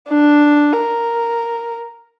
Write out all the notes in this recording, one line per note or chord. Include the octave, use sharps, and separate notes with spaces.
D4
A#4